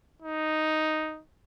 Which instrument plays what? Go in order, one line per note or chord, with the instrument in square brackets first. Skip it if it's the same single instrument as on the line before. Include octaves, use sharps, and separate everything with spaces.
[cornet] D#4